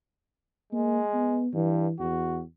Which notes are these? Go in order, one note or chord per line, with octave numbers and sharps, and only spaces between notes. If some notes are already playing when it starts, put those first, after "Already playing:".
G#3 A#3
B3
G2 E3
E2 F#4